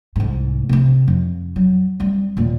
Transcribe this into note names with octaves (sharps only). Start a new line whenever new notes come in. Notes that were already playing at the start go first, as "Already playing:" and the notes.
C2 G#2
C3 C4
F2
F#3
G3 C4
D#2 A#2